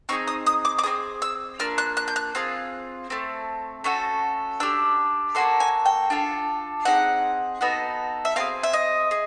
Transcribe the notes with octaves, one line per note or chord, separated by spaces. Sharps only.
C4 D#4 G#4 C#6
D#6
D#6
D6
D6
C4 F4 G#4 D#6
E6
A#3 D4 F4 F6
F#6
F#6
G6
F#6
C4 F4 G#4
A3 C4
A3 C#4 F#4 A4
D4 G4 E6
A#3 C#4 F#4 A4 C6
G#5
G5
D4 F4 A4
C4 D#4 G#4 F#5
B3 D#4 F#4 A4
E5
C4 F4 G#4 F5
E5
D#5
G#4